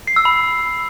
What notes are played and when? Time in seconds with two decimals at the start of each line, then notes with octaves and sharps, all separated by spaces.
0.07 C7
0.16 E6
0.25 B5